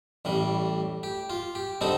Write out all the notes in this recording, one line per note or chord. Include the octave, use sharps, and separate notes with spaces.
A1 A2 G3
G4
F4
G4
D3 G3 C4 D#4 A4